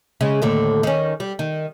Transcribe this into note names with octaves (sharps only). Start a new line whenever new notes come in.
C#3 G#3
D#2 A2 D3
D#3 C#4
G3
D#3